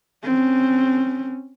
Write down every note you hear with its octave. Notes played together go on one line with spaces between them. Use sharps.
C4 C#4